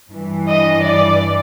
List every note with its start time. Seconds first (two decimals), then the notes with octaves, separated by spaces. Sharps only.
0.10 G2 E3
0.48 D#5
0.86 D5